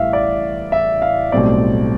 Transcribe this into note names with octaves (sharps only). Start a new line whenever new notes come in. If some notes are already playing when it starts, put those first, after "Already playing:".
Already playing: A1 A2 G3 E5 F5
D5
E5
F5
B1 A2 G3 C4 D5